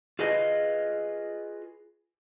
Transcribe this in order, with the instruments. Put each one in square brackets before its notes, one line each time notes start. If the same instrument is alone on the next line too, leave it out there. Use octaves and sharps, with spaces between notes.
[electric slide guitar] F4 G#4 B4 D#5